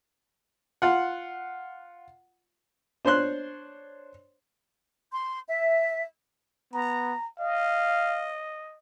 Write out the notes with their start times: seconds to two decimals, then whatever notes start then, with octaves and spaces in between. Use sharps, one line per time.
0.82 F4 F#5
3.05 D4 C5 C#5 C6 F#6
5.13 C6
5.48 E5
6.74 B3 A#5
7.40 D#5 F5